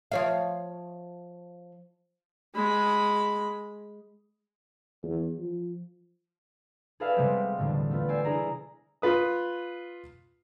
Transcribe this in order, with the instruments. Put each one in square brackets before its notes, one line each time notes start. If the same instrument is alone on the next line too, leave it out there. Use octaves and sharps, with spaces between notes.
[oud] F3 C#5 F5
[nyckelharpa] G#3 B5
[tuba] E2
F3
[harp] G#4 A4 B4 D5 E5 F5
C3 G3 G#3 B3 C4 G4
E1 A2 D3 G3 D4
A3 B3 F4 B4
D5 G5 G#5 E6 C7
D4 E4 G#4 G#5 A#5
[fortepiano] F4 B4 D#6